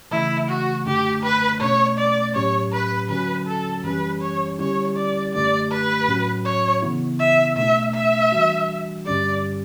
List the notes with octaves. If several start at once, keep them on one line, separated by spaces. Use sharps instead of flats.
C#3 E3 A3 E4
F#4
F#2 D3 A3 D4 G4
B4
B2 A3 C#4 C#5
D5
A2 F#3 C#4 G4 C#5
B4
D3 F#3 C#4 F#4 B4
A4
F#2 E3 G3 C#4 G4 B4
C#5
D3 G3 C#4 E4 G4 C#5
D5
F#2 D3 A3 D4 G4 D5
B4
A2 F#3 C#4 F#4
C#5
C#3 E3 B3 E4
E5
B2 A3 D4 E5
E5
E3 G3 D4 F#4
G2 D3 G3 C#4 G4 D5